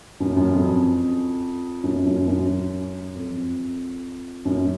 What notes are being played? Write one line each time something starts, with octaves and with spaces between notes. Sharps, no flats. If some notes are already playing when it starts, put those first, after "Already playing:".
F#2
F#2
F2
F#2
F#2
F#2
F2
F#2